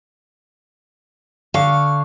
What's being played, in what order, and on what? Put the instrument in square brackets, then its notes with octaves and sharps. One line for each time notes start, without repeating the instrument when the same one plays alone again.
[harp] D3 C#6 [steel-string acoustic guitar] F5